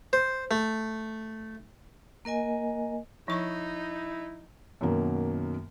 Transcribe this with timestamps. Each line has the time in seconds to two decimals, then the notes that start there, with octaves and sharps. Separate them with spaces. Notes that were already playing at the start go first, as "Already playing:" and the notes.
0.13 C5
0.51 A3
2.25 A#3 A#4 D#5 G#5
3.28 F3 D#4 E4 C#6
4.81 F#2 B2 D#3 F#3 A#3